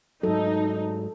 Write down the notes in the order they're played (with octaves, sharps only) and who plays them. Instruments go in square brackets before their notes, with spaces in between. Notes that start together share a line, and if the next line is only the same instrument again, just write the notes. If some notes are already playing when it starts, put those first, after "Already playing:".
[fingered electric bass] G#2 F#3 [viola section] D#4 [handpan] A4